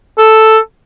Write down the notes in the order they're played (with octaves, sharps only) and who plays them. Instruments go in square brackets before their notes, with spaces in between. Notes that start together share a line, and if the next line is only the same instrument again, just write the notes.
[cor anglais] A4